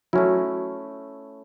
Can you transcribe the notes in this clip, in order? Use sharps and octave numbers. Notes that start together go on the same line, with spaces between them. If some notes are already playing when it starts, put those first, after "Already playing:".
F#3 A3 C#4 E4